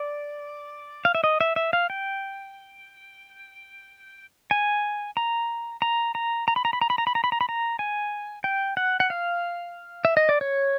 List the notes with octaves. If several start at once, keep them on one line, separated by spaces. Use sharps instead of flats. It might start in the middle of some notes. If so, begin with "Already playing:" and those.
Already playing: D5
F5
E5
D#5
E5
E5
F5
G5
G#5
A#5
A#5
A#5
A#5
B5
A#5
B5
A#5
B5
A#5
B5
A#5
B5
A#5
B5
A#5
G#5
G5
F#5
F#5
F5
E5
D#5
D5
C#5